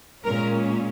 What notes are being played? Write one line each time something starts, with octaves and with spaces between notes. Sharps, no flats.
A#2 G#3 C#4 A#4